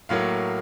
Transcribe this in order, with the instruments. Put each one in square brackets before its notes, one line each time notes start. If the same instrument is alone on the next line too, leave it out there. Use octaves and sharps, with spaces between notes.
[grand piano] A2 F#3 A#3 F5